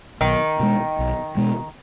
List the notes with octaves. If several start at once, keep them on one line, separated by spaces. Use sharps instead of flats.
B1 D#3
B2 G#3
B1
B2 G#3